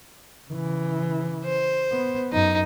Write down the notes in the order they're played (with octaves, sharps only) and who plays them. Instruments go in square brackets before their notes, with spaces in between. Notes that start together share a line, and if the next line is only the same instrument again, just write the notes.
[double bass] C#3 E3
[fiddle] C5
[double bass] B3
[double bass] F#2 [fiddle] D#4